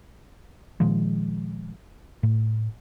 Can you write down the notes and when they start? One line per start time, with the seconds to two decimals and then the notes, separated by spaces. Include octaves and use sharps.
0.80 A#2 D#3 F3 G#3
2.23 A2